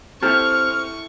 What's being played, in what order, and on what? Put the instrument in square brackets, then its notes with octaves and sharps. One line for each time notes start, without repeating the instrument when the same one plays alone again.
[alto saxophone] C4 [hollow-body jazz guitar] E4 G4 A4 [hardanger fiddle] C#6 [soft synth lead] F6